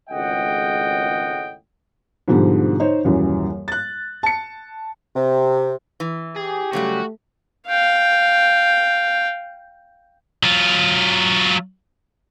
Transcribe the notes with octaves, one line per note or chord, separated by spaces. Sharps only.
G#1 C#2 A2 D#5 F#5 G5
G#2 B2 D3 F3 G3
D#4 C5 C#5
D#1 F#2 E3
F#6 A6
A5 C#7
C3
E3
G4 G#4
C#3 F#3 G3 A3 F#4
F5 G5
F#3 F4